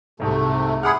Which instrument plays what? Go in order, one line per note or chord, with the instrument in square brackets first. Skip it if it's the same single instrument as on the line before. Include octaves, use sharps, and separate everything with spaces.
[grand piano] C2 G#2 [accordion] C3 A3
[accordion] G#4 F#5 [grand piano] B5 D6 F6